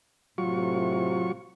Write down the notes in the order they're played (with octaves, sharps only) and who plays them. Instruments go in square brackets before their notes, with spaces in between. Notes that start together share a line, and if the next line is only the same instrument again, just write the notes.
[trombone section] A2 C3 [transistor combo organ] F#3 F4 C#6